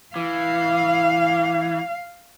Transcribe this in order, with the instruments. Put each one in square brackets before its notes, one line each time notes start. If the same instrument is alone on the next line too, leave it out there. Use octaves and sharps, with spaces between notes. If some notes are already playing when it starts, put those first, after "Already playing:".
[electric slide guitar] E3 [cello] F5